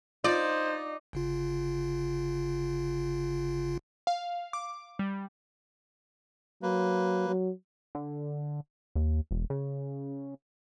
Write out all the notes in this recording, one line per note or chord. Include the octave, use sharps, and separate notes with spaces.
D#4 F4 C5 D5
G1 C#3 F4
F5
D6
G3
F#3 A#3 B4
F#3
D3
D#2
E1
C#3